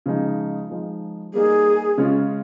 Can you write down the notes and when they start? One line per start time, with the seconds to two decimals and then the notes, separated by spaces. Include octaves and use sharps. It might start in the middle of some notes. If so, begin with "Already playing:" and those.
0.06 C#3 F3 G#3 D#4
0.70 F3 G#3 D#4
1.34 G3 A#3 D#4 G#4
1.98 C#3 G#3 C#4 F4